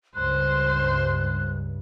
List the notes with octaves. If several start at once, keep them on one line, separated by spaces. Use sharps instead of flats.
C#2 G2 C5 F#6